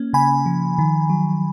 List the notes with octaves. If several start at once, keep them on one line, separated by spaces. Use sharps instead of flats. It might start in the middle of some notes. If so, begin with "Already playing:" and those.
Already playing: A#3 C#4
C#3 G#5 B5
F3
D#3
F#3